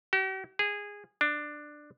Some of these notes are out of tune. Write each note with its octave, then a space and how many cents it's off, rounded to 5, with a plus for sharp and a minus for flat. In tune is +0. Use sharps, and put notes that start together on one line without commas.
G4 -45
G#4 -15
D4 +10